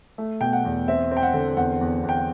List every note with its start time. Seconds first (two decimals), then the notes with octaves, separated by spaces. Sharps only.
0.18 A3
0.41 B2 G5
0.53 F#5
0.65 E2
0.88 C4 E5
1.11 C4
1.17 G5
1.23 F#5
1.34 D3
1.57 E2 F#5
1.81 E2
2.03 E2
2.09 G5
2.17 F#5